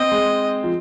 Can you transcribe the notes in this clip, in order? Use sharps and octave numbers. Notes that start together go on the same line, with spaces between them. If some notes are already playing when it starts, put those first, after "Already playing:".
Already playing: C4 D#5
G#3
F3